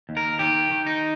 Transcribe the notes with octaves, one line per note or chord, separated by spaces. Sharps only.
D#2
A#4
D#3 G4
D#3
D#4